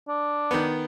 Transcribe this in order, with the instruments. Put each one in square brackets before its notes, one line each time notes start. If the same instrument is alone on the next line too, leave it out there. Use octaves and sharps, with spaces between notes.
[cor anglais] D4
[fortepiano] D#3 B3